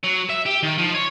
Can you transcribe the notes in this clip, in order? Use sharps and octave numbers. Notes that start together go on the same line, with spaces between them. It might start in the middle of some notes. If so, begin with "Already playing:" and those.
F#3
E5
G4
D#3
F3
C#5